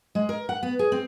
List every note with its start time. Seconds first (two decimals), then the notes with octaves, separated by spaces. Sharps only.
0.15 G#3
0.29 A#4
0.49 F#5
0.63 B3
0.79 G#4
0.92 C4